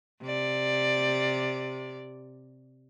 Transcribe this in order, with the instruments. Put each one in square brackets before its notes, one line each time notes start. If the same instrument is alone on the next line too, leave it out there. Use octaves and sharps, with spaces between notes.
[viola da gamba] C3 D5